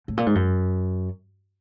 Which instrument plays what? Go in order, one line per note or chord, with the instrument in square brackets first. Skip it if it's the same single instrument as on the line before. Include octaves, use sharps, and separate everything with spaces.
[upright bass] A2
A#2
G#2
F#2